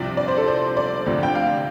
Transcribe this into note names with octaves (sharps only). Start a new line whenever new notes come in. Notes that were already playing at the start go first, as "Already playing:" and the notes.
Already playing: C2 C3 F3 D5
D5
C5
A4
C5
D5
D2 C3 F3
G5
F5